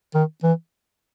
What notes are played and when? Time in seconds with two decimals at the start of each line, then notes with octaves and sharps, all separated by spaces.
0.14 D#3
0.43 E3